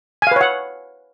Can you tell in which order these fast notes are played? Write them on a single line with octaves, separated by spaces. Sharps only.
G#5 F5 B4 C#5 F#5